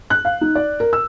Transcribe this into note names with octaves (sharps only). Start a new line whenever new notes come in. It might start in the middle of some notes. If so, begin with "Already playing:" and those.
F#6
F5
D#4
D5
A#4
E6